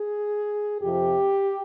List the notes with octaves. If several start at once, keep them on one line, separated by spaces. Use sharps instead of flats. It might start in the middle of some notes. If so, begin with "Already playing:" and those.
Already playing: G#4
F2 C3 F3 G4